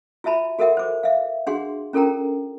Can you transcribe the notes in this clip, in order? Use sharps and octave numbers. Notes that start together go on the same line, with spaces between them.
F4 F#4 E5 A5 B5
F#4 A4 A#4 E5 F#5
C5 D6
E5 F5
D4 F#4 G#4 F#5 C6
C#4 F4 A4 A#4 G5 A#5